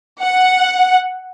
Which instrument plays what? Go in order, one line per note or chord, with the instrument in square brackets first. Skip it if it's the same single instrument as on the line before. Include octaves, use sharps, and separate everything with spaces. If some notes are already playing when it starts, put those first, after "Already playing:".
[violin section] F#5